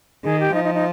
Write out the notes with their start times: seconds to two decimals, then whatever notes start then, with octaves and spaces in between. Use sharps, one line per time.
0.24 D#3 G#4
0.39 G4
0.53 F3 D#4
0.64 D#4
0.74 D#4